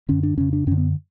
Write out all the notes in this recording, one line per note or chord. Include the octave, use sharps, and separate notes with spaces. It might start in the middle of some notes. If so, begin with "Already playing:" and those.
F#2 D3 C#4
D4
F2 C#3 C#4
D4
F#2 D3 C#4
B3